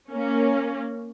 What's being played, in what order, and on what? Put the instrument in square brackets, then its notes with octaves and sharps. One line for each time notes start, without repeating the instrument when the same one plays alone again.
[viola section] A#3 C#4